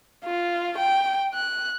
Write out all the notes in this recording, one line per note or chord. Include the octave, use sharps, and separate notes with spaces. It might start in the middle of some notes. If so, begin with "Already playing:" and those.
F4
G5
F#6